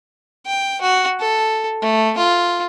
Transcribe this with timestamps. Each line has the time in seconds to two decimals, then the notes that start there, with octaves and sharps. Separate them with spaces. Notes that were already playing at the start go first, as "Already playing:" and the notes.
0.46 G5
0.82 F#4
1.20 A4
1.82 A3
2.18 F4